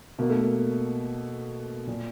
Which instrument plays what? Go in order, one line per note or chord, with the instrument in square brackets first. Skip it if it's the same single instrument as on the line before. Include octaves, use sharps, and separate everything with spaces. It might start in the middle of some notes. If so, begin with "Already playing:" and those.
[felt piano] B2 A#3
A3
A#3
A#2